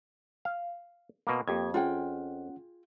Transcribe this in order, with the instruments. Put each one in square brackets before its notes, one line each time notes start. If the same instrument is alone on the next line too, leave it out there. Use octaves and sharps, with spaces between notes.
[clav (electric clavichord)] F5
B2 A#3
[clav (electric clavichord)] F2 [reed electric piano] A#3 G4 G#6
[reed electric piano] C#4 F#5 [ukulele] F4 G#4 G5